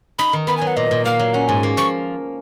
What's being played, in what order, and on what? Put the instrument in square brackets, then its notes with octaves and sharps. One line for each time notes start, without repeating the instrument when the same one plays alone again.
[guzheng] D#4 [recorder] B5
[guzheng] D#3
[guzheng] B3 [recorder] B5
[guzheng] F#3 [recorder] G#5
[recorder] F#5
[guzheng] A#2 [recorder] D#5
[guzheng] A#2
[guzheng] A#3 [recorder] F5
[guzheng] F#3
[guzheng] C#4 [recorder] F#5
[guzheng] G#2 [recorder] G#5
[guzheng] A#3
[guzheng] F3 [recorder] C#6